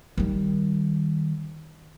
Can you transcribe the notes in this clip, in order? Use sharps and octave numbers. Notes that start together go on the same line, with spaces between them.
D#3 G3